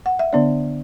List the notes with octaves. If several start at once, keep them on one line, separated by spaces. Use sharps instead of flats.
F#5
E5
D3 B3 D4 D5